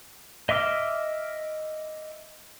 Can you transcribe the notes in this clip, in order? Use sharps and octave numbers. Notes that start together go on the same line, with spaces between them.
D#5 E5 D6 E6 F6